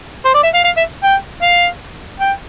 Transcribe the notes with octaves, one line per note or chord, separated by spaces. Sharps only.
C5
D5
E5
F5
F5
E5
G5
F5
G5